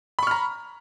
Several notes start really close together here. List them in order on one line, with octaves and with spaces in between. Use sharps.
B5 C#6 F6 A#5